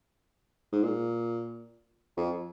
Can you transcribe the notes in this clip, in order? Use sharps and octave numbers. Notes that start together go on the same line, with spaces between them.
G#2
A#2
F2